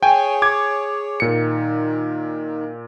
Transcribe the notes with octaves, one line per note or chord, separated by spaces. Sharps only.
G#4 C#5 G5 G#5
D6 G#6
A#2 D#3 C#7